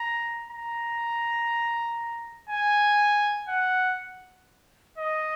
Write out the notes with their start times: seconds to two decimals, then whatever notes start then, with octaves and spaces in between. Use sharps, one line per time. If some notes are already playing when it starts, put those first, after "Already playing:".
Already playing: A#5
0.50 A#5
2.49 G#5
3.49 F#5
4.98 D#5